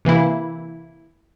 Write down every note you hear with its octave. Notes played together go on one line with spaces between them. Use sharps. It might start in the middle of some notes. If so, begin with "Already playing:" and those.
C3 E3 A#3 E4